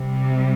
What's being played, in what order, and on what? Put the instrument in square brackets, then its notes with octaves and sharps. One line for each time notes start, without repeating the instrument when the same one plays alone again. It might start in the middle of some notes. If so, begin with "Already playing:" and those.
Already playing: [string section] C3 G3